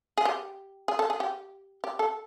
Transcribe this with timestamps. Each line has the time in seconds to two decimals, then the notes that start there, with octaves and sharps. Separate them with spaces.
0.18 G#4
0.25 G4
0.88 G#4
0.99 A4
1.10 G#4
1.20 G4
1.84 G4
1.99 A4